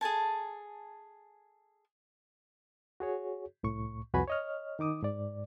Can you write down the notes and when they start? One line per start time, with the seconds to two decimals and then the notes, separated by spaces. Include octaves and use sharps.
0.01 G#4 A4 G#5 A5
3.00 F#4 G#4 C#5
3.63 C2 A2 C#6
4.14 C2 F2 F#4 B4 G#5 B5
4.27 C#5 D#5 F6
4.79 D#3 D#4 D6 D#6
5.02 G#2 D5